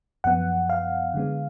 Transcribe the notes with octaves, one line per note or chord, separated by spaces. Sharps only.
F#2 F3 B3 F#5
F5
D3 G#3 B3